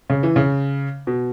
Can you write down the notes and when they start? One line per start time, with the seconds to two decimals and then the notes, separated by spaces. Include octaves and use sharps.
0.10 C#3
0.23 E3
0.36 C#3
1.07 B2